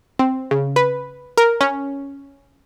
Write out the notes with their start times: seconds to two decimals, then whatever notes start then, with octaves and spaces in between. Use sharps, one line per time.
0.19 C4
0.51 C#3
0.76 B4
1.38 A#4
1.61 C#4